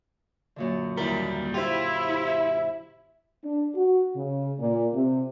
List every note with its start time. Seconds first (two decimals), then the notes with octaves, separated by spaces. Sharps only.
0.56 F#2 A#2 D3
0.97 D#2 G3 E4 A#4
1.54 E4 F4 G4 C5
2.27 E5
3.44 D4
3.75 F#4
4.16 C#3
4.59 A#2
4.93 C3